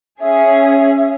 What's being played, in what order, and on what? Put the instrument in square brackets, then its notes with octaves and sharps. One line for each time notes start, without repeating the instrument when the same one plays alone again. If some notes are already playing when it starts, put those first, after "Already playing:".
[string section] C#4 G#4 [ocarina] E5